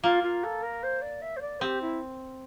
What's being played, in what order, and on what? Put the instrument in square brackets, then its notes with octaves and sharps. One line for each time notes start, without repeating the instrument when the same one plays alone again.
[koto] A#3 [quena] F4
[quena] F4
A4
A#4
C5
D5
E5
C5
D5
[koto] C4 [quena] G4
[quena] E4